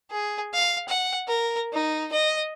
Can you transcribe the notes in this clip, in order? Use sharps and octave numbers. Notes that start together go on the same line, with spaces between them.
G#4
F5
F#5
A#4
D#4
D#5